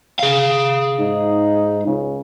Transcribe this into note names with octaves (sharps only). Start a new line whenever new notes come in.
G#4 F5
G#2 D#4
C#2 C#3